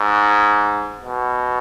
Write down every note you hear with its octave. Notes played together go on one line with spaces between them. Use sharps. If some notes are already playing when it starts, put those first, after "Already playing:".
Already playing: G#2
B2